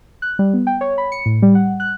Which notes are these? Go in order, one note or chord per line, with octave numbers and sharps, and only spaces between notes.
F#6
G3
B3
G5
C#5
B5
C#7
A2
G3
F#5
F#6